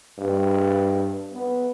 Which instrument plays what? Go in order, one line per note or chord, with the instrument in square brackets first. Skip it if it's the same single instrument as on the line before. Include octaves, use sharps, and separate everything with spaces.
[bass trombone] G2
B3